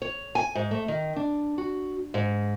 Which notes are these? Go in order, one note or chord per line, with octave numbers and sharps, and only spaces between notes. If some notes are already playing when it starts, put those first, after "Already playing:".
C#5
G#5
G#2
A3
D#3
D4
F#4
G#2